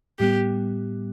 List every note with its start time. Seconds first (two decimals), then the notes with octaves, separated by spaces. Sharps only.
0.19 A2 G3 B3 G4